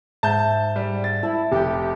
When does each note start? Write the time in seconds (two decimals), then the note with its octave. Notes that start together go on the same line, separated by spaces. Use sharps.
0.23 G#2 E5 A5 G6
0.76 G3
1.04 A6
1.23 E4 E5 A5
1.51 F1 G4